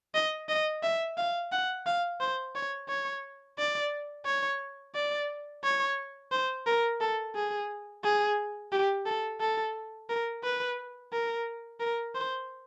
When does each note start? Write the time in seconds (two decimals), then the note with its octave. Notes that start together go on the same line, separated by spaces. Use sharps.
0.15 D#5
0.49 D#5
0.83 E5
1.17 F5
1.52 F#5
1.86 F5
2.20 C5
2.55 C#5
2.89 C#5
3.58 D5
4.26 C#5
4.95 D5
5.64 C#5
6.32 C5
6.67 A#4
7.01 A4
7.35 G#4
8.04 G#4
8.72 G4
9.06 A4
9.41 A4
10.09 A#4
10.44 B4
11.12 A#4
11.80 A#4
12.15 C5